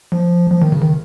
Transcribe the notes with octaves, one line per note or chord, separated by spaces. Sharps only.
F3
F3
D#3
C#3
D#3